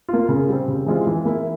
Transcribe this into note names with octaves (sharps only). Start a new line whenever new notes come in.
A#3 F4
C#3
G3 C4
C#3
E3 G#3 C4 F4
E3
A#3 E4